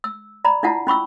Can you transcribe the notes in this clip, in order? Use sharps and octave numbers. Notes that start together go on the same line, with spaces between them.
E6
D5 A#5 B5
D4 E4 F4 F#5 A5
C#4 B5 C#6 E6